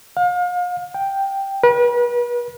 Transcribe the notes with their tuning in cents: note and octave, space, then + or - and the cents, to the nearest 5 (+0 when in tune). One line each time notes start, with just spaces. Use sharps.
F5 +35
G5 +0
B4 -40